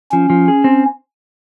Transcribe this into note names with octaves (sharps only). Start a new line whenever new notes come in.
F3 C#4
F3
G#4
C4